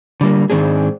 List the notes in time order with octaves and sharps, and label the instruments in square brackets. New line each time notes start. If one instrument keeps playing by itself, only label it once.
[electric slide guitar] D3 G3 A#3
G#2 D#3 A#3 C4 D4 G#4